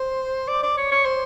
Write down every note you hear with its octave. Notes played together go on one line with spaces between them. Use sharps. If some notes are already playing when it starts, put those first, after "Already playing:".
Already playing: C5
D5
D5
C#5
C#5
C5